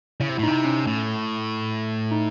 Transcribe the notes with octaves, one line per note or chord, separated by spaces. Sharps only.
C#3 E4
C3
A2 E4
C3 D#4
C#4
A2
D#4